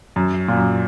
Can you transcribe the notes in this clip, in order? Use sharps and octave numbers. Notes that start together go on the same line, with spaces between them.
F#2
A#2
F#2